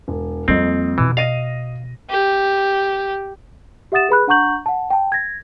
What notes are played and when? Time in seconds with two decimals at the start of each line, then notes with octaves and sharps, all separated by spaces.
0.08 E1
0.48 F2 G3 A#3 C4 D#5
0.98 B2 E3
1.17 D#5 F5 A#6 D#7
2.10 G4
3.92 G4 E5 F#5 D#6 A6 E7
4.09 G#4 B4 B5 F#6
4.28 D4 F#5 A#5 C#6 G6 F#7
4.66 F#5 A5
4.90 G5 A5
5.12 G#6 A#6